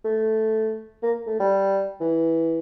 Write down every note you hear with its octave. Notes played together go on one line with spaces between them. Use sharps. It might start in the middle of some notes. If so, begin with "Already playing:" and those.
A3
A#3
A3
G3
E3